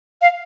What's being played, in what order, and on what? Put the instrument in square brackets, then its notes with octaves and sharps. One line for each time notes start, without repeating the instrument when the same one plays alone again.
[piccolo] F5